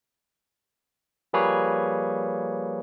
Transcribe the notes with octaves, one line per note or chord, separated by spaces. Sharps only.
F3 G3 A#3 G#4 B4 C#5